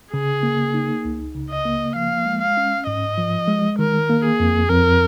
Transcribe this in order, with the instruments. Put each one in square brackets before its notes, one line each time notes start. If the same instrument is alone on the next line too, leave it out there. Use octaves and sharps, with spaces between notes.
[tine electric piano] C#3 [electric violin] G#4
[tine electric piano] A#3
D#4
C#2
C#3
[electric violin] D#5
[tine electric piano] A#3
[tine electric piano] F3 [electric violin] F5
[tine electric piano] G#3
[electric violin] F5
[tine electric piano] C#4
[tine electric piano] G#2 [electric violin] D#5
[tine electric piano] F3
G#3
[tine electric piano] D#3 [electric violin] A#4
[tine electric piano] A#3
[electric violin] G#4
[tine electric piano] F2
[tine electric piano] F2 [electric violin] A#4